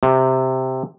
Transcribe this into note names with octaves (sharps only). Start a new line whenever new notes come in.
C3